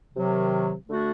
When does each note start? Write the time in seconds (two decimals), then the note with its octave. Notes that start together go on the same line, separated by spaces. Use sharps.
0.13 C3 D#3 F#3
0.87 D3 A3 D4 F#4